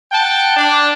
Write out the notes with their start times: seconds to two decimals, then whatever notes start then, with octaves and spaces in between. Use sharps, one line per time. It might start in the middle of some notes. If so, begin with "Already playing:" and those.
0.12 F#5 G5 A5
0.57 D4